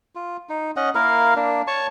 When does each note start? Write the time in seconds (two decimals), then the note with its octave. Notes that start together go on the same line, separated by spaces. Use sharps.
0.15 F4
0.49 D#4
0.76 C#4 D#5 F#5
0.95 A#3 E4 A#4 F5
1.36 A#3 D4
1.67 C#5 A5 C#6